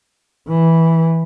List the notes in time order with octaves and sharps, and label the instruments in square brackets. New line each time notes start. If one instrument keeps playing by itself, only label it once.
[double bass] E3